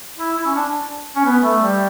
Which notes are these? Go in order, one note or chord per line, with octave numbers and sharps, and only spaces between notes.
E4
E4
C#4
D4
C#4
B3
A3
G3